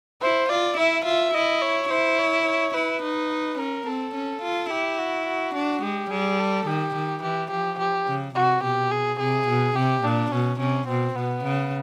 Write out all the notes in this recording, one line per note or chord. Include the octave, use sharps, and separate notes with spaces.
E4 C5
F4 D5
E4 E5
F4 E5
E4 D#5
C#5
E4 C5
C#5
C#5
E4 B4
D#4
C#4 A#4
C4 A4
C#4
F4
E4 G4
F#4
F#4
D4
G#3 G4
G3 G#4
A4
D#3 G4
D#3
E3 G4
F3 G4
G4
C#3
C3 F#4
B2 G4
G#4
C3 G#4
B2
C3 G4
A#2 D4
B2 C#4
C3 C#4
B2 C4
B2 B3
C#3